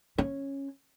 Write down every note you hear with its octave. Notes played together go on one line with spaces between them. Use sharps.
C#4